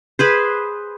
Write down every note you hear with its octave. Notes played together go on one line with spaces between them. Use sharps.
G#4 B4 C5